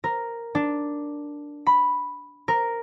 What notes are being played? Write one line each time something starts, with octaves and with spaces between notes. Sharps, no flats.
A#4
D4
B5
A#4